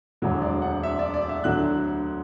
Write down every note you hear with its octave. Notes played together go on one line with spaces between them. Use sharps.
E1 D2 D3 F#3
D5
F#5
E5
D5
D5
E5
D2 D3 F#3 F#6